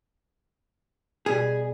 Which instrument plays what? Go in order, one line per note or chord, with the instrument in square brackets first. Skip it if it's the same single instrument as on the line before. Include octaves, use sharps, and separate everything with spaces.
[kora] B2 G3 [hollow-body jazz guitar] G#4